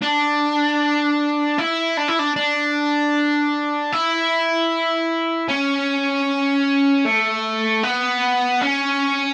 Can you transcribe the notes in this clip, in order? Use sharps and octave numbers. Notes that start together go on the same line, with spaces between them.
D4
E4
D4
E4
D4
D4
E4
C#4
A3
B3
C#4